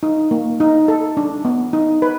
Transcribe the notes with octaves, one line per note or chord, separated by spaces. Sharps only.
D#4
A#3
D#4
A4
D4
B3
D#4
B4